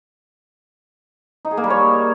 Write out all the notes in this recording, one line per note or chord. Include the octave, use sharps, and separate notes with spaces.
D#4
G#4
A#3
G3
C#5